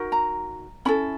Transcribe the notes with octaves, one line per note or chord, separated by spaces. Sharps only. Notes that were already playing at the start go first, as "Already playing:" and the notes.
Already playing: D#4 F#4 A#4
A#5
C#4 E4 A4 B5